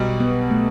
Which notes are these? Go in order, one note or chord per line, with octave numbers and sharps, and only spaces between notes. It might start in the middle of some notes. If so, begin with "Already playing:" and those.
Already playing: B1 B2 G3
B3
A3